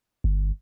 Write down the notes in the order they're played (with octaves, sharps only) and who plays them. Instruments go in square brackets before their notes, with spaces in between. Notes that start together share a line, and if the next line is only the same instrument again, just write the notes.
[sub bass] G1